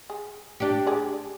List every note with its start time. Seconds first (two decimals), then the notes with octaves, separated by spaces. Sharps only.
0.10 G#4
0.60 D4 G4
0.87 G#4 D5